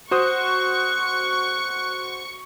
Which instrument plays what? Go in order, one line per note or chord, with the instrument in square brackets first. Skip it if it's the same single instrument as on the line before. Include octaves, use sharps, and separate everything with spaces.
[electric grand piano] F#4 C5 D#6 [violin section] C#6 [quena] F#6